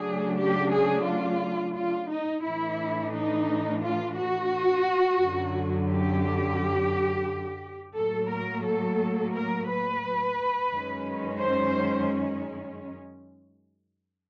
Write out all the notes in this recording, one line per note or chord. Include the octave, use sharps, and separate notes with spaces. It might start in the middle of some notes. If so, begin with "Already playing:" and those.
Already playing: C#3 F#3 A3 D4 G#4
G4
G#4
F4
F4
D#4
A2 E3 A3 D4 E4
D#4
F4
F#4
F#2 D3 F#3
G4
A2 F#3 A#3 A4
A#4
A4
A#4
B4
F#2 D#3 G#3 C#4
C5